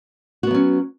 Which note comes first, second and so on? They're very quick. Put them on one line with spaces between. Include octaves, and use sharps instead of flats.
F#4 B3 F#3 C#4